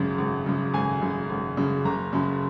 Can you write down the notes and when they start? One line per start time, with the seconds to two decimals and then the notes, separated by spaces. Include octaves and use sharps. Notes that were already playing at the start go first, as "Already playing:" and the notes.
Already playing: G#1 F#2 C#3
0.18 G#1
0.46 F#2 C#3
0.74 G#1 G#5
1.01 F#2 C#3
1.30 G#1
1.57 F#2 C#3
1.85 F#1 A#5
2.13 F#2 C#3